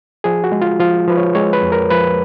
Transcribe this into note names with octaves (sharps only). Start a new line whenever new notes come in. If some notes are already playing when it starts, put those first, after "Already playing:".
F3 G#4
F#4
G#3
F4
F3 F4
F3 B4
C#5
G#3 C#5
B4
F2
A#4
F3 B4